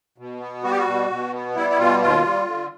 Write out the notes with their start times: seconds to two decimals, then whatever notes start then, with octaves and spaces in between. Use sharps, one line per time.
0.18 B2
0.40 B3
0.64 G3 F#4
0.71 G4
0.78 F#4
0.86 B2
1.10 B2
1.33 B3
1.56 G3 E4
1.70 E4
1.79 B2 F4
2.02 D#2 F4
2.24 G3
2.47 D3